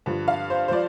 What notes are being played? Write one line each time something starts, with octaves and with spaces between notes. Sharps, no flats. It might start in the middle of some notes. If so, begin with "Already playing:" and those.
G2 D3 F3
F5
C5
C5
F3 D5